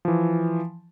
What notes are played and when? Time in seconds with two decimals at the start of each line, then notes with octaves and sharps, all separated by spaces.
0.05 E3 F3